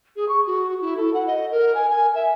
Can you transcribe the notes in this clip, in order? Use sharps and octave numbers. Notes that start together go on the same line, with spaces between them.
G#4
C#6
F#4
E4
A4
F#5
D#5
A#4
G#5
G#5
E5